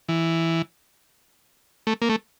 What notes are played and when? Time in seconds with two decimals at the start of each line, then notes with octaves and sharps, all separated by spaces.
0.09 E3
1.87 A3
2.02 A#3
2.09 A3